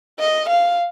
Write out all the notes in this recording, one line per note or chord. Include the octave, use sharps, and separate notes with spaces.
D#5
F5